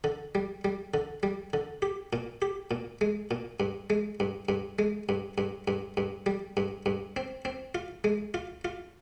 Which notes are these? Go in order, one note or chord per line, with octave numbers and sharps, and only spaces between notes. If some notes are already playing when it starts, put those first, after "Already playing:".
D3
G3
G3
D3
G3
D3
G4
A#2
G4
A#2
G#3
A#2
G2
G#3
G2
G2
G#3
G2
G2
G2
G2
G3
G2
G2
C4
C4
F4
G#3
F4
F4